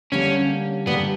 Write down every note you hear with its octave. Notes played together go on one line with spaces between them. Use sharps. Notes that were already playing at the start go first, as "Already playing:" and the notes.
D3 G3 A#3 C#4
D3 G3 A#3 B3